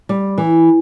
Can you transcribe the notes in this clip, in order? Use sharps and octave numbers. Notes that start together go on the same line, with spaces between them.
G3
E3